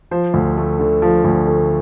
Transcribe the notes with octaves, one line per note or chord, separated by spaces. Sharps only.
F3 C5
D2
A3
D3
F3
D2
A3